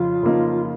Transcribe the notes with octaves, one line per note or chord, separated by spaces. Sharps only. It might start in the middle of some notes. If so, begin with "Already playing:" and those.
Already playing: F2 C#3 F3 F4
C#3 F3 A#3 D#4